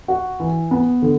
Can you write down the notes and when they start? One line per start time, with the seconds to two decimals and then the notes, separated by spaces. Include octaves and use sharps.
0.08 F#4
0.40 E3
0.71 B3
1.02 D3